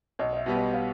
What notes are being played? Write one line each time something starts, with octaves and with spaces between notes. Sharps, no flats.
B1 D#5
D#5
E5
B2 G3 B3
D#5
F5